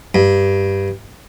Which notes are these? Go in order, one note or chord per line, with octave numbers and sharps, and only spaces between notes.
G2